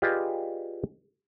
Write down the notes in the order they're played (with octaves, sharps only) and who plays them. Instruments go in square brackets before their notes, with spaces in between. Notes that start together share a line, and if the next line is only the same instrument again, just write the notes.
[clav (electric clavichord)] F4 G4 G#4 B4 D5 D#5